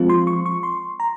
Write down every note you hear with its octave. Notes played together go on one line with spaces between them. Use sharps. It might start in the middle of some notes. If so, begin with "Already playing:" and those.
Already playing: F3 G#3 C4 F4
C6
C#6
C#6
C6
A#5